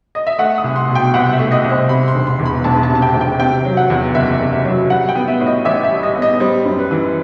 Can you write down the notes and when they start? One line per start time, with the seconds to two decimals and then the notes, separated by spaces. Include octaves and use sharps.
0.15 D#5
0.27 E5
0.38 A3 F#5
0.58 D#6
0.64 C2
0.76 C6
0.88 B2
0.95 G5
1.14 C2 F#5
1.33 E5
1.39 A3
1.52 D#5
1.64 C2
1.70 C5
1.89 C3 B5
2.08 C6
2.14 E1
2.27 C6
2.39 E2
2.46 B5
2.64 E1 A5
2.83 A5
2.90 C3
2.95 A5
3.02 G5
3.15 E1
3.21 G5
3.39 C3 G5
3.65 F#3
3.77 F#5
3.90 E2
4.15 F#1 E5
4.40 C3
4.53 E5
4.65 F#3
4.90 G3 F#5
5.09 G5
5.15 B3
5.28 E5
5.40 A2
5.47 D#5
5.65 A1 E5
5.84 E5
5.91 G3
6.03 D#5
6.16 B3
6.22 D#5
6.40 G3 C5
6.65 F#2
6.79 B4
6.91 E3